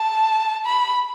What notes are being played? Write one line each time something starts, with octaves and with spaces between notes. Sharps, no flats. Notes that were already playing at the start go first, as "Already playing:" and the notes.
Already playing: A5
B5